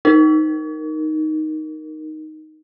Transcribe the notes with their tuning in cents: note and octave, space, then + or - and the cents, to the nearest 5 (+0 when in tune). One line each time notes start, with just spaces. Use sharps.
D#4 +0 A#4 +0